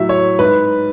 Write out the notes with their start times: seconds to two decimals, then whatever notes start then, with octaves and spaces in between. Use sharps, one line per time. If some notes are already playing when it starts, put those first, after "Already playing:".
Already playing: A2 F#3 E5
0.09 C#5
0.39 G#2 B4